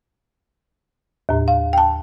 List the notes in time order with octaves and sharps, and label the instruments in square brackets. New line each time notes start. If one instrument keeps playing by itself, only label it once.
[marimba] D#2 A2
F5
G5 A5